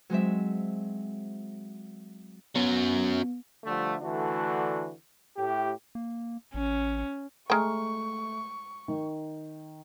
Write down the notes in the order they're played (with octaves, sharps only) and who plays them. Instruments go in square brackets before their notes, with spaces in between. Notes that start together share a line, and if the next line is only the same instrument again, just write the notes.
[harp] F#3 G#3 C4 E5
[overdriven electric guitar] F#3 C#4 [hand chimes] B3
[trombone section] D3 F3 G3 A3
D3 E3 A3 D4 F#4
A2 G4
[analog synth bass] A#3
[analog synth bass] A1 [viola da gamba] C#4
[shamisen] G#3 G5 [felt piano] A3 [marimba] A#5 F6 [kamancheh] C#6
[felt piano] D#3